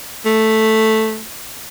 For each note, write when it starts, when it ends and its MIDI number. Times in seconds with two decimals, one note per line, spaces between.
0.26 1.23 57